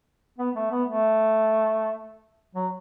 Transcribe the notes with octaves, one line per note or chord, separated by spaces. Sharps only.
B3
A3
B3
A3
F#3